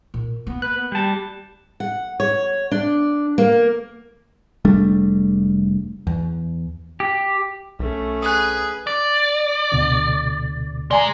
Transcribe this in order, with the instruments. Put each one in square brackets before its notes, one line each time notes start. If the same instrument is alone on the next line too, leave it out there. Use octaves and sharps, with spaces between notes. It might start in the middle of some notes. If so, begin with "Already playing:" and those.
[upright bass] A#2
[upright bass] A#3 [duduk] B3
[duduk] B4 [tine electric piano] F#6
[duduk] B3
[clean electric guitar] G3 A5 [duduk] G4
[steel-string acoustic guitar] F#5
C#5
D4
A#3
[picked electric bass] F1 G3 A3 D4
E2
[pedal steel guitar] G4
[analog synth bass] B1 [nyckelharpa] A3 C#4
[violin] G#4 B4 [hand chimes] D#6 F#6
[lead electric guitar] D5
[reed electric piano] D2 B2 D3
[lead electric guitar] G#3 [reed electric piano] D5 G#5 A#5